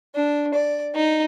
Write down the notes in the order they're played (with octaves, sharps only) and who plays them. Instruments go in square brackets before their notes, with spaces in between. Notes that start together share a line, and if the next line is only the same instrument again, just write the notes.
[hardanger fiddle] D4
D5
D#4